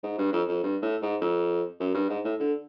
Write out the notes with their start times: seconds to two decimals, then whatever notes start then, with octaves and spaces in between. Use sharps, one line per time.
0.03 G#2
0.18 G2
0.33 F2
0.48 F2
0.63 G2
0.82 A2
1.02 G#2
1.21 F2
1.80 F#2
1.94 G2
2.09 G#2
2.24 A2
2.40 D3